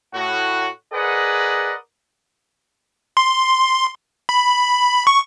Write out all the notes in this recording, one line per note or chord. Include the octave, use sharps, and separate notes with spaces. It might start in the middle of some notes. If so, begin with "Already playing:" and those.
A2 F#4 F#5
G#4 A#4 B4 D5 D#5 F#5
C6
B5
C#6